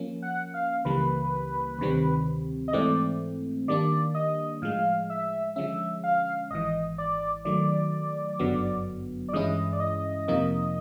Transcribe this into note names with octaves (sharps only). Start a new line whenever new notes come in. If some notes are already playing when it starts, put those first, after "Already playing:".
Already playing: F3 A#3 C#4
F#5
F5
C#2 C#3 E3 G3 A#3 B4
D2 C3 D#3 G3 C4
D#5
G#2 E3 A3 C4 D5
D#3 G3 A#3 D4 D5
D#5
A2 F3 G#3 F5
E5
D3 F3 G#3 C#4 E5
F5
G#1 G#2 E3 D#5
D5
D#3 F#3 A3 D5
G1 F#2 D3 F#3 B3
D5
G2 E3 G#3 C#4 E4 D#5
D5
D#5
F2 C3 F3 A#3 D#4